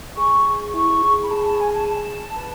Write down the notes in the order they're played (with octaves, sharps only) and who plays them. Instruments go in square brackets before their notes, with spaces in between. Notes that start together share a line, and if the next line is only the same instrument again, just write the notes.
[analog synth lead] G#4 [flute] C#6
[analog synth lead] E4 [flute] C#6
[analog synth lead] G#4
[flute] B5
[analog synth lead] G#4 [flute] A5
[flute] A5
G#5
A5
A5
[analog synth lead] B4